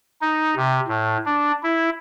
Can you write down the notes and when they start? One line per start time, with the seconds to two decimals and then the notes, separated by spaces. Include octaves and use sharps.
0.21 D#4
0.56 C3
0.87 A2
1.26 D4
1.63 E4